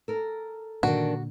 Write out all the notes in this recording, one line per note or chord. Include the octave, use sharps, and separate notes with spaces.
A4 A#4
A#2 D3 D#3 D4 F#4